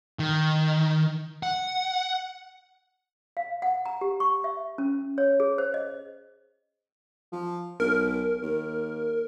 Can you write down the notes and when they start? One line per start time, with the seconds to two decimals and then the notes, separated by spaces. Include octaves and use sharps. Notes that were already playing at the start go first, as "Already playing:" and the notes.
0.19 D#3
1.43 F#5
3.37 F5
3.62 F#5
3.86 A#5
4.01 G4
4.20 C#6
4.44 E5
4.78 C#4
5.18 C#5
5.40 G#4
5.58 C5
5.74 D#5
7.32 F3
7.80 B1 A#4
8.42 D#2